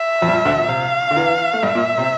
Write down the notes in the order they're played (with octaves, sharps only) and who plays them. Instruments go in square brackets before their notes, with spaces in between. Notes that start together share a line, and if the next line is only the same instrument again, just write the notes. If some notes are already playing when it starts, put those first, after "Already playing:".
Already playing: [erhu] E5
[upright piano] F2 F3
G3
F2 F3
D2 D3
A#2
[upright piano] C3 [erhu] F5
[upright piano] D3
E2 E3
A3
[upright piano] G2 G3 [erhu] E5
[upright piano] A#2 A#3
C3 C4